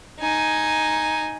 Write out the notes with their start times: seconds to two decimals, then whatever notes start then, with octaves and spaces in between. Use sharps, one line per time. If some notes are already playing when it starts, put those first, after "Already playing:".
0.20 D#4 G#5